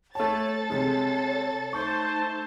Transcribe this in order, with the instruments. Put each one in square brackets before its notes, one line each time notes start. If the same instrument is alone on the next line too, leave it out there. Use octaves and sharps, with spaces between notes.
[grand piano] A3 A5 [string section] A4 A6 [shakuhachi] C#5
[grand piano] C3 G#3 [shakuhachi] C#5
[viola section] A3 C5 A5 [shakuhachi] D#4 [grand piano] C#6